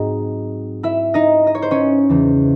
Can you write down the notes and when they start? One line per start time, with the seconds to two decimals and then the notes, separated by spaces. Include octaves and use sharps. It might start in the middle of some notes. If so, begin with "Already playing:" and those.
Already playing: G#2 F#3 C4 D#4 D#5
0.83 E4 E5
1.14 D#4 D#5
1.47 D#5
1.55 C#5
1.62 C5
1.71 C#4 C#5
2.09 E2 C#3 E3